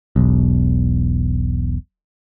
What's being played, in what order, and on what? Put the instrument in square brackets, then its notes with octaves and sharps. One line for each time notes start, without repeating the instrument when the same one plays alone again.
[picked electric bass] E1 B1